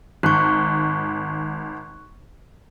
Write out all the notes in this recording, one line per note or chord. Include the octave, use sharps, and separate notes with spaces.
G#1 C#6 F#6